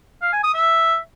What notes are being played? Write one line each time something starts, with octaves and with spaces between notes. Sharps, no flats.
F5
G#5
D#6
E5